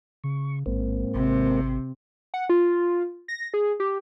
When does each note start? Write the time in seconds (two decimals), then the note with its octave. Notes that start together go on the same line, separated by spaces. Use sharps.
0.24 C#3 C#6
0.66 A1 G#2 A#3 C4
1.15 G#1 C3
2.34 F#5
2.49 F4
3.28 A#6
3.54 G#4
3.80 G4